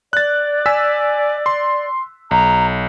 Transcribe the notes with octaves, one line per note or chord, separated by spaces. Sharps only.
D5 F#6 A6
G#5 E6 B6
C6
B1 A#5